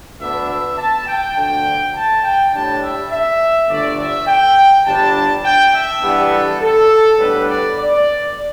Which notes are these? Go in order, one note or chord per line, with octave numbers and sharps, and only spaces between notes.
D2 D3 B3 D4 E5
E5
A5
G5
D2 D3 A3 D4 G5
A5
G5
A2 G3 D4 A5
E5
E5
G1 G2 D3 A3 D5
E5
G5
G1 G2 G3 D4 A5
G5
E5
G2 E3 G3 B3 D4
A4
A4
A2 G3 B3 D4 B4
D5
D5